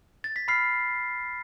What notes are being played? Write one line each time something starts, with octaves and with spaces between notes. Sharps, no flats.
A6
B6
B5 F6 C7